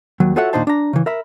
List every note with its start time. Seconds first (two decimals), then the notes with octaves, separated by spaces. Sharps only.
0.20 D#2 F#3
0.36 F4 F#4 A4 C#5 E5 F#5
0.53 D#2 A#2 D4 D#4 C5 A5
0.67 D4 A#5
0.93 C#3 E3
1.06 A#4 E5 B5